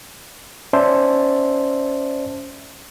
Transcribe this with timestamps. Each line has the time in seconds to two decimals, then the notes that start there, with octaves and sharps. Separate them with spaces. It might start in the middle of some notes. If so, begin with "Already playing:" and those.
0.73 C#4 C5 D5 E5 A5 C6